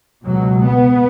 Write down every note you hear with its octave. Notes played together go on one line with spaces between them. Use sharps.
C#2 B2 F#3
B3